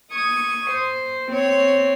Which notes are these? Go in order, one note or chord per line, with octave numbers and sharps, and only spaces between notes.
C#6 D#6 G#6
C5
C4 C#5